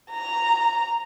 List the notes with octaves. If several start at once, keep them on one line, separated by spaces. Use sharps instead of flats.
A#5